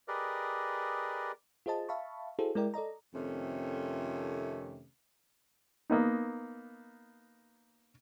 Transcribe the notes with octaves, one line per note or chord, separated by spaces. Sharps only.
G4 G#4 A#4 B4 D5 D#5
F4 G#4 C5 D#5 A5
E5 F5 A5 B5 C#6
E4 F#4 G#4 A4 C5
G#3 E4 A#4 D5 G5
A4 D5 D#5 A#5
F2 C3 D#3 A3 C#4
A#3 B3 D#4